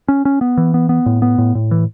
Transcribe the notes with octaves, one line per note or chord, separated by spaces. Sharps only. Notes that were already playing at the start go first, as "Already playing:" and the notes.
C#4
C#4
B3
E3
B3
B3
A2
B3
A2
A2
E3